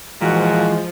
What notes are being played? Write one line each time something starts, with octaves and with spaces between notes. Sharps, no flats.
A#2 E3 F3 G#3 F#4